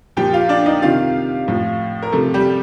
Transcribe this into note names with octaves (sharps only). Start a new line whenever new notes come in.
A#2 F3 G4 G5
F4 F5
D4 D5
D#4 D#5
C3 D#3 F4 F5
A2 F3
A#4
C3 F3 A3 A4
G3 G4